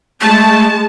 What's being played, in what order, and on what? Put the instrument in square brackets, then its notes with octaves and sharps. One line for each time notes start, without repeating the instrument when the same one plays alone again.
[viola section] G#3 A5 [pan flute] A3